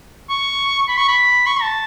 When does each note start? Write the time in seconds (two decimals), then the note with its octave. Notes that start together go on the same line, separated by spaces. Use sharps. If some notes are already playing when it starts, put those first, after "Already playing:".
0.29 C#6
0.88 B5
0.98 C#6
1.08 B5
1.47 C#6
1.62 A5